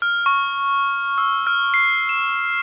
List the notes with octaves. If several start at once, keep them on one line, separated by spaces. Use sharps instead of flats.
F6
C#6
E6
F6
C7
E7